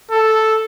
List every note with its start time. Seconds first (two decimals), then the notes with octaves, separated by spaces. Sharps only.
0.12 A4